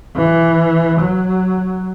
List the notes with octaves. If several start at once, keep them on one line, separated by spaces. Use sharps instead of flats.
E3
F#3